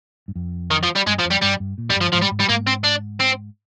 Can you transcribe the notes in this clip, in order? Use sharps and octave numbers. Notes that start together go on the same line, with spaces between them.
G2
F2
D#3
F3
G3
G2 G#3
F3
F2
G3
G2 G3
G2
A#2
F2 G3
G2
F3
G#2 F3
G3
G#2
G3
G#2 A#3
C4
D4
C4